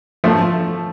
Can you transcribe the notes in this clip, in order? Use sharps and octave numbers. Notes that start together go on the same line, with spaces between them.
F3 A3